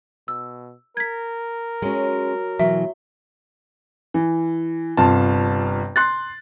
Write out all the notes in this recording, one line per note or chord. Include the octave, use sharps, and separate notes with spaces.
B2 E6
A#4 G#6 B6
F#3 G#3 C#4
B2 E3 F#3 E5 C6
E3
G1 C3 F4 A5
C6 F#6 A6